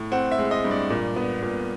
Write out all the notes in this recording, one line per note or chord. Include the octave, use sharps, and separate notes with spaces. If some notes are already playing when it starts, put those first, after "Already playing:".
Already playing: A2
C4 F#5
E5
G#3
D#5
G2
D5
A#2
B3
A#2